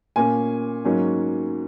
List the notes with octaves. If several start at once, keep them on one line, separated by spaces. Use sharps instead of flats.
A#2 A#3 C#4 G#5
G#2 F#3 A#3 C#4